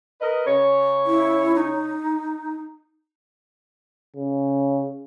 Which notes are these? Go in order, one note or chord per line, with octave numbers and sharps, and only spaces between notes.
A#4 B4 D#5
C#3 C#5
E4
D#4
C#3